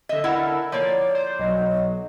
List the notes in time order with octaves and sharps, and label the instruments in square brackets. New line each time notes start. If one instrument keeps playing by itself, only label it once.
[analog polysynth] D3 E5 [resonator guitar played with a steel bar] D#5
[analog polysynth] D3 A4 A#4 [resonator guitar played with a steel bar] E4 F#5
[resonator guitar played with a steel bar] F3 A#3 [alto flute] C#5 [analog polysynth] D5
[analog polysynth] C5
[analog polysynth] B1 F#3 [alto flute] D#5